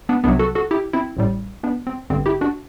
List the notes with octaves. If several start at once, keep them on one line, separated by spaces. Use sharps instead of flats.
B3 D4
C2 C3 F#3 B3 D4
F#4 A4
F#4 A4
E4 G4
C4 E4
A1 A2 G3
B3 D4
C4
A1 G2 D3 C4
E4 G4
D4 F#4